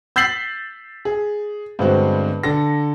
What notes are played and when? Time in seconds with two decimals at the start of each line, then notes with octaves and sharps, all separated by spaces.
0.16 E6 G6 A6 B6 C7 F#7
1.05 G#4
1.79 G2 D3 G#3 B3 C4 F#4
2.43 D3 A4 A#6